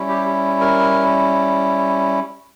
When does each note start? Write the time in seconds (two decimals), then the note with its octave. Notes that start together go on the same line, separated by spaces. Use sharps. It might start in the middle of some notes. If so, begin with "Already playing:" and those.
Already playing: G3 C#4 E4
0.08 G4
0.61 A#4